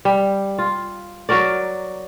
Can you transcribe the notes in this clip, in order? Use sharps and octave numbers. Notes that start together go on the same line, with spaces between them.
G3
F4
F#3 F#4 A#4 D5